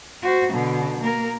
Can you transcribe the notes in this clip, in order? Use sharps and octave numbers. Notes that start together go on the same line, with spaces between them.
F#4 C5
B2 D3
A#3 A#4